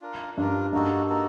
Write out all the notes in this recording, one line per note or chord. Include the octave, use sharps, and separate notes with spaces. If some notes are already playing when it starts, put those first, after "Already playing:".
D4 F4 A#4
G2 D4 F4 A#4
G2 A#3 D#4 F#4 A4
A#3 D#4 F#4 A4